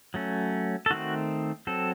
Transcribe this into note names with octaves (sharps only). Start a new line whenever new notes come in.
F#3 A3 C#4
A4
D#3 A3 C4 F#4
F#3 C4 A4